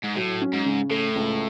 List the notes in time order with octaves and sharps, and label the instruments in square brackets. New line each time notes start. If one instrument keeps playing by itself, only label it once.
[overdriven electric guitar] G#2
[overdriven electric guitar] A2 [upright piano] F#3
[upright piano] C#4
[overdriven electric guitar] G#2
[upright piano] C#3
[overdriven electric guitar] A2 [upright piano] A3
[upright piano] C#2